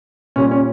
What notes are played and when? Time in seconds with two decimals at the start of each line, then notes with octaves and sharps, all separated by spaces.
0.36 A#2 G3 C#4
0.51 C#4